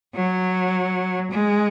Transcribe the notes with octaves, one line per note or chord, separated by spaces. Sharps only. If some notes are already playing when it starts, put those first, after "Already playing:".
F#3
G#3